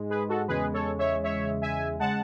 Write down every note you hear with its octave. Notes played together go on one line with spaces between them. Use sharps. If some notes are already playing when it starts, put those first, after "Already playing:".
Already playing: G#2 G#3
G#4 B4
F#4 A4
E2 C#3 G#3 G#4 B4
A4 C#5
C#5 E5
C#5 E5
E5 G#5
C#3 G#3 F#5 A5